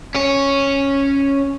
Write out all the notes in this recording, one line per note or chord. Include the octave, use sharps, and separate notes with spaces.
C#4 C#5